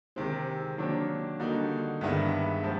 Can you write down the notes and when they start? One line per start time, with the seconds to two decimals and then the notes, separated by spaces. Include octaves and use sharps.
0.16 C3 D#3 G#3 C4
0.78 D#3 F#3 A#3 D4
1.40 D3 G3 A#3 D#4 F#4
2.01 G2 D#3 G#3 B3 E4
2.64 C3 F3 G#3